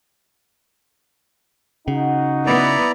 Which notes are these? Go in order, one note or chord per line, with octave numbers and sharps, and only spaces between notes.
C#3 D#4 F#4 F#5
B3 E4 D5 A#5